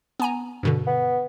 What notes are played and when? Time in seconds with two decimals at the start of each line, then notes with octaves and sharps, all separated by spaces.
0.20 B3 G#5 A#5
0.63 G2 B2 D3
0.87 B3